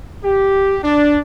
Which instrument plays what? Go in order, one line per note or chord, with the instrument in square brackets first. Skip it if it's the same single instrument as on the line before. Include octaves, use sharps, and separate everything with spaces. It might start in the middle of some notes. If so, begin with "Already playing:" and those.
[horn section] G4
D4